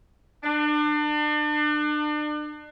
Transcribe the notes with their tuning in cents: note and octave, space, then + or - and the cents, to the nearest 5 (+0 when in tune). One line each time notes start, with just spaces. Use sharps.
D4 +35